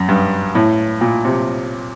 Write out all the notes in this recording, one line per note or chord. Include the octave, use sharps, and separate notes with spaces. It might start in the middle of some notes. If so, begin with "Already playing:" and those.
Already playing: F#2
G2
A2
A#2
C3